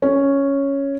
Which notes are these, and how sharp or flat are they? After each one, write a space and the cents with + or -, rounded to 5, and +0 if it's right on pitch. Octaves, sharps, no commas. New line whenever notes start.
C#4 +0